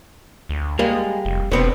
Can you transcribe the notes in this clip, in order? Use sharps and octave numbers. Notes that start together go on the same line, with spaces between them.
D2
G3 G#3 A#3
F1
E1 D3 B3 C4